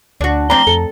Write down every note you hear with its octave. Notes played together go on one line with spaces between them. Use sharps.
D2 D4 F#4
F3 C4 D4 A#5 G7
F2 A4